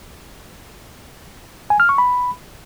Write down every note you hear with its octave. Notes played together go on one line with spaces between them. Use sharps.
G#5
F6
C#6
B5